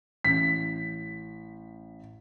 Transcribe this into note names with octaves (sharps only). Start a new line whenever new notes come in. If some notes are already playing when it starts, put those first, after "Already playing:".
A1 B6